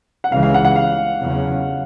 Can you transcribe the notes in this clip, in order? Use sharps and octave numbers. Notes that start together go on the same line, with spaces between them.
F#5
C#2 C#3 E3 G#3 F5
F5
F#5
F#5
F5
E2 C#3 F#3